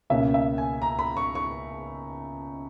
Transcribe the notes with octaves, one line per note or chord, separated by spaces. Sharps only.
C#2 B2 A#3 C#4 E5
E5
G#5
A#5
B5
C#6
C#6